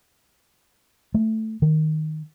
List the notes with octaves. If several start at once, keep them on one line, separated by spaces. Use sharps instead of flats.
A3
D#3